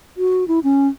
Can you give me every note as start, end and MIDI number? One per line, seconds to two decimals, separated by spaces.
0.17 0.47 66
0.48 0.59 64
0.64 0.88 61